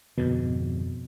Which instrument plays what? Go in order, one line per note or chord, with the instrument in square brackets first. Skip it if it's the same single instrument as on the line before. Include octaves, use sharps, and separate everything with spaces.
[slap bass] F2 G#2 D3 [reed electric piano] B2